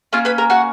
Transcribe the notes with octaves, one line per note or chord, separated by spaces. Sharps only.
A#3 C#4 F4 F5
B4 B5
A#4 A#5
F#4 F#5